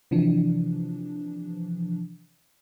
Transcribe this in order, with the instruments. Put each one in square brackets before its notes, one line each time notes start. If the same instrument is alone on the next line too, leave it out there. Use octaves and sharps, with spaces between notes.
[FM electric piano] C3 E3 F3 D4